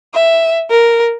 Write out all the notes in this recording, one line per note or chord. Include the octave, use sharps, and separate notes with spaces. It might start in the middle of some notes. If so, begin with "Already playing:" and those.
E5
A#4